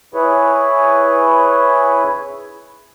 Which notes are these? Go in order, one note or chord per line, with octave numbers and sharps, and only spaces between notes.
E4 G#4 B4 C#5